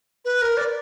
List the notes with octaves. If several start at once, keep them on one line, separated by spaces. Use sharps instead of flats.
B4
A#4
D5